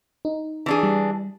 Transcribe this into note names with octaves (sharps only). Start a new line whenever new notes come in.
D#4
E3 D4 G#4
G3